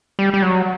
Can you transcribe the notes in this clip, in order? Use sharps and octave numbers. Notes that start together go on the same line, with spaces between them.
G3
G3
F#3